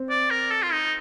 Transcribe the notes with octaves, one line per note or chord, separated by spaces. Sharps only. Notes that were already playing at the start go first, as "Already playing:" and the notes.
Already playing: C4
D5
A#4
A4
F4
D#4